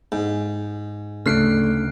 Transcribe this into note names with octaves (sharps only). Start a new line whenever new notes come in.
G#2
D2 C#3 A3 D4 F6 F#6 C7 D7